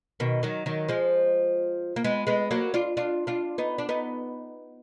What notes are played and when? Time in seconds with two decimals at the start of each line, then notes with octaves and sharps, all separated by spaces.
0.20 B2 D#3
0.43 D#3 F#3
0.66 D#3 F#3
0.88 F3 G#3
1.96 A#3
2.04 G#3 B3
2.27 G#3 B3
2.51 F#3 A#3
2.74 D4 F4
2.97 D4 F4
3.27 D4 F4
3.58 B3 D#4
3.78 D4
3.89 B3 D#4